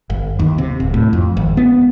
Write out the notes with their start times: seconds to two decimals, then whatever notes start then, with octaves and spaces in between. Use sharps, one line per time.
0.10 G1
0.39 D#2
0.58 C3
0.80 D1
0.94 A2
1.13 F2
1.37 G#1
1.57 B3